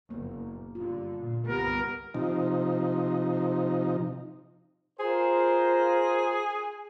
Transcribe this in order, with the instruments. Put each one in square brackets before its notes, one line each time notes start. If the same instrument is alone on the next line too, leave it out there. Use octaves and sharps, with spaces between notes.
[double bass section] F#1 [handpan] A#3 B3
[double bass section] G2 D3 [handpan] F4
[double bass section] A#2
[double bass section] C2 G2 B3 [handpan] D3 G4 [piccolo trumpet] A#4
[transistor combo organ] C3 F3 D#4
[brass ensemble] F4 A#4 C5 [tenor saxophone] G#4